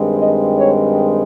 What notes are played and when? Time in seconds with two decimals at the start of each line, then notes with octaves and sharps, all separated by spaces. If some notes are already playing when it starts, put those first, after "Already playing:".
Already playing: G2 D#3 G#3 C4
0.17 D#5
0.57 C#5